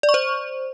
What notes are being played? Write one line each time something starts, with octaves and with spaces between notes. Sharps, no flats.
D5
C#6
C5